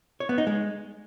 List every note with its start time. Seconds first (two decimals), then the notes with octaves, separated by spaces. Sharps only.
0.20 C#5
0.29 B3
0.38 D#4
0.47 G#3